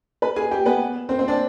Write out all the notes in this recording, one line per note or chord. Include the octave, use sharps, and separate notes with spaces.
B4 B5
G#4 G#5
G4 G5
B3 B4
C4 C5
C4 C5
D4 D5